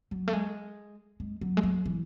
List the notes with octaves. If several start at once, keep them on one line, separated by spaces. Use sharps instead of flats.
F#3
A3
G#3
G#3
F#3
G#3
F#3
E3